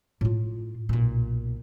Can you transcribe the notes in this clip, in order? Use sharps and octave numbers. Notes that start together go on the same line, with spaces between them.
A2 F4
B1 A#2